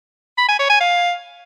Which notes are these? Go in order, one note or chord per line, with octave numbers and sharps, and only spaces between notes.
B5
G#5
C#5
G#5
F5